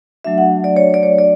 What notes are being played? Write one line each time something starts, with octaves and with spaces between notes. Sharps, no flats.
F#3 A3 D4 F#4 E5
F#5
D5
C#5
D5
C#5
D5